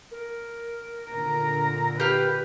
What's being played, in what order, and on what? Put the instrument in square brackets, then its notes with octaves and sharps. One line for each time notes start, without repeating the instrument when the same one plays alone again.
[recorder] A#4
[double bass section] A#2 D3 [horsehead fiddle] A#5
[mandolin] G4 F5 [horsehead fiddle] B4